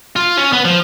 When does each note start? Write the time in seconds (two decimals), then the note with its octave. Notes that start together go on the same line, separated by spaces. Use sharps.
0.16 F4
0.37 C#4
0.53 B3
0.65 F3